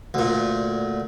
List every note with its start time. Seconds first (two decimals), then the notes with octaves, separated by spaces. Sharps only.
0.14 D2 A#2